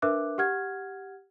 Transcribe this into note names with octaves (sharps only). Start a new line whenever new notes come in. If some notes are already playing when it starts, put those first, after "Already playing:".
D4 A#4 B4 E5 D6 F#6
G4 F#5 F6 G#6